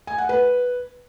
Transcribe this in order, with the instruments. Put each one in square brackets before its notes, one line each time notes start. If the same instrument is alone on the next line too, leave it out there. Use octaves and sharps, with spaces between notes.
[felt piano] G#5
F#5
B4